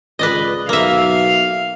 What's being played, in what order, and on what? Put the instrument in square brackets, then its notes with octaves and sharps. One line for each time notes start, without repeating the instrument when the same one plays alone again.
[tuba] C#2 [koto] B4 D5 D#5
[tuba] B1 [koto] A#3 E5 [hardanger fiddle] F5